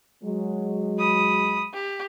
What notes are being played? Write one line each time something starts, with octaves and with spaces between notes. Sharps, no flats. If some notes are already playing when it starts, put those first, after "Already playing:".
F#3 G#3
B5 D#6
G4